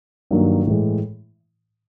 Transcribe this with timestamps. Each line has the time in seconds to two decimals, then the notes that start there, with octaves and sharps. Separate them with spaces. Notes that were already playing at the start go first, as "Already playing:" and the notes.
0.31 G2 D#3 F#3 A#3
0.67 A2 E3 G#3